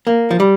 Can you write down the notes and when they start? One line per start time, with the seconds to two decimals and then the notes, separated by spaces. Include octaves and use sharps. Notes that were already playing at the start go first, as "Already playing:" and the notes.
0.07 A#3
0.31 F3
0.40 G3